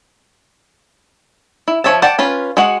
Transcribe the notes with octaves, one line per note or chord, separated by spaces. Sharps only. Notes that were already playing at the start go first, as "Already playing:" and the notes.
E4
F3 G#4 C#5 E5 A5
D5 F#5 G5 A5
C#4 F4 B4
G#3 F#4 F#5